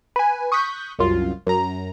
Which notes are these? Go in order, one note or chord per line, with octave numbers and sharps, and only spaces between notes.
B4 G#5
C#6 D#6 F#6 G6 B6
C2 F#2 F4
F#2 A#5